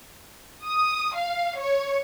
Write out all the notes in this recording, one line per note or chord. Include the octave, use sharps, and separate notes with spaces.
D#6
F5
C#5